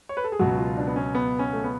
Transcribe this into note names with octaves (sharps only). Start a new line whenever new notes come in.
C#5
B4
A4
G#4
C#2 B2 F#3 F#4
F4
D4
B3
C#4
B3
C#4
A3
B3